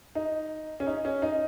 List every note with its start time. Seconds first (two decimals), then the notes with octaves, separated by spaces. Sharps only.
0.15 D#4
0.80 C#4
0.87 D#4
1.05 C#4
1.22 D#4